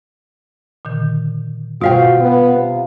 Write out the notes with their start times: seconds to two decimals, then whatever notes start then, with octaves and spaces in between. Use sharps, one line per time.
0.85 A#2 D3 D#3
1.81 B2 G3 F4 F#4 C5 F5 G5
2.20 B3
2.54 C3